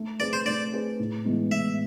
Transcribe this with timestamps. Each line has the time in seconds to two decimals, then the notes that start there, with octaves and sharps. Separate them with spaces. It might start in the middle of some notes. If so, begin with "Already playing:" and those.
Already playing: A3
0.20 C4 G#4 B4 D5
0.33 C5
0.46 A3 D5
0.73 C4 G#4 B4
0.99 A2
1.25 E3 G#3 B3
1.51 A2 E5